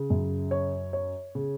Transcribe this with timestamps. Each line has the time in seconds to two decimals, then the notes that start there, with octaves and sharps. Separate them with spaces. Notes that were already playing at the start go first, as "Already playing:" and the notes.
Already playing: C#3
0.10 F#2
0.51 C#5
0.93 C#5
1.35 C#3